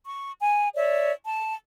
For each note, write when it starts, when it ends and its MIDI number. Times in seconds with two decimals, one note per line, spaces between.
0.06 0.32 85
0.41 0.68 80
0.74 1.13 73
0.74 1.13 74
0.74 1.13 76
1.23 1.53 81